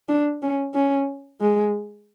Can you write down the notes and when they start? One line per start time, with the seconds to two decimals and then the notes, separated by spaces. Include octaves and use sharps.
0.09 D4
0.43 C#4
0.74 C#4
1.41 G#3